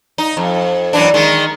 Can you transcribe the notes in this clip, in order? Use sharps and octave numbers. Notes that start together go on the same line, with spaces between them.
D#4
F2
F#2 E3 D4
D#3 G#3